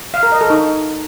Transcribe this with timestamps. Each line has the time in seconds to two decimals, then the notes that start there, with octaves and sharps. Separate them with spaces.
0.14 F5
0.23 A#4
0.32 D#5
0.41 A4
0.50 D#4